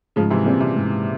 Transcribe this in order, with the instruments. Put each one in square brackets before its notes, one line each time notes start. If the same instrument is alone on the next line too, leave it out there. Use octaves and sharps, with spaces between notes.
[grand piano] G#2 [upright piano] C#3 F3
[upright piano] C3 E3
[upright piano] A#2 C#3 [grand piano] G3 C4
[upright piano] C3
[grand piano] G#2